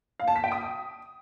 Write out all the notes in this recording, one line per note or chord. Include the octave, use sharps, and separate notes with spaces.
F5
A5
B6
G5
D#6